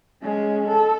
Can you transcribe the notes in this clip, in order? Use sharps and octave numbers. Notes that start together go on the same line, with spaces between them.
G#3 C#4
A4